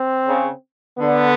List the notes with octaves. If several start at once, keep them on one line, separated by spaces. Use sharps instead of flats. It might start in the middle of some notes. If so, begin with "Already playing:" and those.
Already playing: C4
C#3
D3 B3